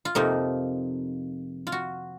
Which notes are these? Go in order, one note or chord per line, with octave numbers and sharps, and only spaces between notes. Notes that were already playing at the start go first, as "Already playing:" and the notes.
F4
F2 C3 F3 A#3 D#4
F4
F#4